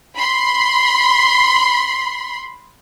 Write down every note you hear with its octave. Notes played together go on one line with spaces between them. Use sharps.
B5 C6